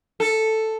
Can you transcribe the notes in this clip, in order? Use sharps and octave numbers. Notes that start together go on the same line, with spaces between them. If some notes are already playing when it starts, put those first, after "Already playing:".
A4